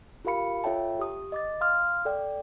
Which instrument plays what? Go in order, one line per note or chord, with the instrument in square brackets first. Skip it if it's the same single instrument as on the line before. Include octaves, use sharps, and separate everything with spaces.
[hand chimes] F4 G4 A#4 F5 B5 C#7
F4 A4 C#5 E5 G5 A5
G4 D#6
D#5 D6 A6
F5 C6 D#6 F6
A4 D5 G5